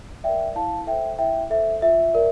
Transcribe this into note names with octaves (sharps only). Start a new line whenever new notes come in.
A#4 D5 E5 G5
E4 F5 A5
A4 C5 E5 G5
E4 E5 G5
A4 C5 E5
F4 E5
A#4 D5